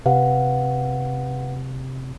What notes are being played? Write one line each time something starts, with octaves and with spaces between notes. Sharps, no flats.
C3 B4 F5 F#5